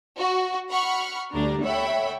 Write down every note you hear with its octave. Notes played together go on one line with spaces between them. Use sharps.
F#4
F#5 B5 C#6 F6
D2 G3 D4 A#5
A4 C#5 E5 F#5 G5 B5